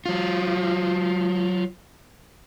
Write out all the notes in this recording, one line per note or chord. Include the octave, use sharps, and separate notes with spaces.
F#3 F4